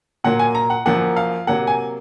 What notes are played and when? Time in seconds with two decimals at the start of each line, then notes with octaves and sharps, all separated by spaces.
0.24 A#2 F#3 A#3 F#5
0.39 G#5
0.55 A#5
0.70 F#5
0.86 F#2 F3 A#3 F#5
1.17 F5
1.47 C3 F#3 A#3 F#5
1.67 G#5